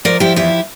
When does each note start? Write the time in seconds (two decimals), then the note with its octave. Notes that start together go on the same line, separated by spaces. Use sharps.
0.05 F3 A#4 D5
0.20 F3 E4 G4
0.36 E2 E4 G4